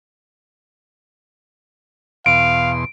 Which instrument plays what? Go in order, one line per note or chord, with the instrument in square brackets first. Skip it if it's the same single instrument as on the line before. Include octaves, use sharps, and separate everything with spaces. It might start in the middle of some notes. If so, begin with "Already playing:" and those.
[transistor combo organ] E2 B2 C6 [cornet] F5 [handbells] D7